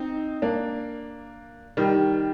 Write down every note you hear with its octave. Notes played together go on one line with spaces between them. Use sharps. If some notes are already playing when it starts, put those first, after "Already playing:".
Already playing: C4 D#4
A#3 D4
D#3 G3